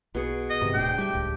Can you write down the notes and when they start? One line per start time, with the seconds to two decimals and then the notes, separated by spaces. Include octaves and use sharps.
0.15 B1 B2 G#4 C#6
0.50 D#5
0.61 G#2 C3 D#3
0.74 D1 A2 A3 D4 G#4 G5
0.98 G3 G4 E5
1.13 D#1 C#2 A2